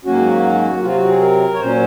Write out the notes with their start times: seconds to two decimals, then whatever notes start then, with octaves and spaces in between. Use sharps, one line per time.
0.05 G#2 D#3 F#3 A#3 C#4 F#4
0.83 C3 F#3 C4 F4
0.96 F#4
1.08 G#4
1.21 A#4
1.54 C#5
1.60 A#2 F#3 C#4 C5